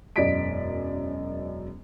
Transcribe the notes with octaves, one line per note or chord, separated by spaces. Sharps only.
E1 F#2 D5 D#5 B6 D7